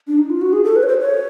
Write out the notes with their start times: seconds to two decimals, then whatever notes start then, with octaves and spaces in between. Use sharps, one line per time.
0.08 D4
0.18 D#4
0.30 F4
0.42 F#4
0.53 G#4
0.64 A4
0.76 B4
0.83 C#5
0.88 C5
0.99 C#5